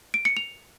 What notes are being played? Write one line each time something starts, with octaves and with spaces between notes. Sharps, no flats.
D7
C#7
F7